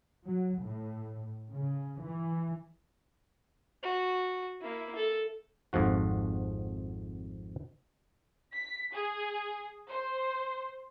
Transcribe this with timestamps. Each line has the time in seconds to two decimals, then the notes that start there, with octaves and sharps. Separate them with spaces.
0.26 F#3
0.62 A2
1.50 C#3
2.03 E3
3.82 F#4
4.61 A#3 E4
4.95 A4
5.73 G#1 F2 G#2 F3 F#4
8.52 B6
8.92 G#4
9.88 C5